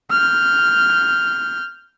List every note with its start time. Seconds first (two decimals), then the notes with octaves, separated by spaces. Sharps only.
0.11 F6 G6